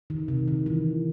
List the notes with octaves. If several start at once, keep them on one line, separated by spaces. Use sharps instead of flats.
D#3
C3
D#3
E3